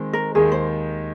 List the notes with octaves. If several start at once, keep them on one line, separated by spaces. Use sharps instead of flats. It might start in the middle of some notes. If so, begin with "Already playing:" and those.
Already playing: D#3 G#3 C4
A#4
D#2 D#3 G#3 G#4
C5